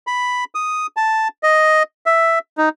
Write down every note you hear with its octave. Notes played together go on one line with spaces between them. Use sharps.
B5
D#6
A5
D#5
E5
D#4